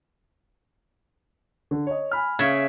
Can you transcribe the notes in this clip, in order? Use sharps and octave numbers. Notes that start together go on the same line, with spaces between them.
D3
C#5 D#5
G#5 B5 F6
C#3 E5 G#6